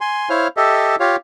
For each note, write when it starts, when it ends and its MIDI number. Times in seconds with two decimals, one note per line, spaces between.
0.01 0.29 80
0.01 0.29 84
0.30 0.48 64
0.30 0.48 72
0.30 0.48 73
0.30 0.48 77
0.30 0.48 89
0.57 0.96 67
0.57 0.96 69
0.57 0.96 75
0.57 0.96 76
1.00 1.16 65
1.00 1.16 67
1.00 1.16 73
1.00 1.16 77